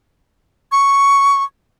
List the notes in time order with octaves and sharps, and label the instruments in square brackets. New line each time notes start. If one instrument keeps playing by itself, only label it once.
[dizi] C#6